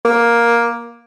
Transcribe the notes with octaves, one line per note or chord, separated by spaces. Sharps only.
A#3